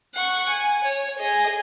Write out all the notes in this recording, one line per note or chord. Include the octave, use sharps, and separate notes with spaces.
F#5 C#6
G#5
C#5
G#4 D#5